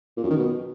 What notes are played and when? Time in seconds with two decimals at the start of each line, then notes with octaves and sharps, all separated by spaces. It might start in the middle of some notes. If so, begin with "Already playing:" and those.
0.17 A#2
0.24 F#2
0.30 D#3
0.37 B2